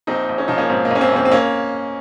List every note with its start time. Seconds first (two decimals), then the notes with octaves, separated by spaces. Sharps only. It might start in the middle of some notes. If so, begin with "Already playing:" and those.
0.07 A#1 C4 D#4
0.29 A#1
0.38 C#4
0.48 F3 D#4
0.58 A#3 C#4
0.70 G#2 C4
0.85 A#3
0.91 A#1 C#4
1.01 C4
1.12 A#1 C4
1.25 C4
1.31 A#3 C#4